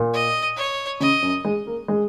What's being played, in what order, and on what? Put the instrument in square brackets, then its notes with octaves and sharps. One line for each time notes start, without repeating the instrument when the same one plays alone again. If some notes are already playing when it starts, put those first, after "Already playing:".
Already playing: [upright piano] A#2
[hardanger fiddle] D#5
C#5
[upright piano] C#3 [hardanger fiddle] D#5
[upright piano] F#2
G#3
A#3
G#3